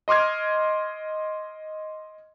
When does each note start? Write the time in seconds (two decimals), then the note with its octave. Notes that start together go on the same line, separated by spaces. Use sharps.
0.08 D#5 C6 D6 F6 G#6